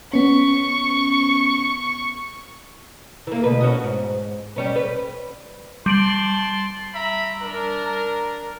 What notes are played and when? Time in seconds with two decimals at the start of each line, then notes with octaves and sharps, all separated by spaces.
0.13 B3 C#4 C#6
3.27 E3 A#3
3.44 D2 B2 B4
3.61 C#4 F#4 D#5
3.84 G#2
4.56 G3 C#4 B4
4.76 B4
5.86 G3 A5 C6 D7 F#7
6.94 E5 A#5 B5
7.42 D4 A#4